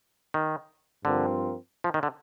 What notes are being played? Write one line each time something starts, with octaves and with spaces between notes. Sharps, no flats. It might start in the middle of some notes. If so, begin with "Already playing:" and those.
D#3
G2 D3 F3 C4 F4 A#4
F3
D#3
D3